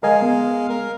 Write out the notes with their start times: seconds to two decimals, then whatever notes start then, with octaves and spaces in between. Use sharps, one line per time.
0.03 G#3 A#4 D#5 F5 G#5
0.22 B3
0.69 A#4